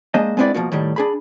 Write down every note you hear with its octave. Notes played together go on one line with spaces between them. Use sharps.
G#3 A#3 D4 C5 D#5
G#3 B3 C4 D4 E4 D5
B2 D#3 F3 A#3 F#4
A2 D#3 G3
D4 G#4 B5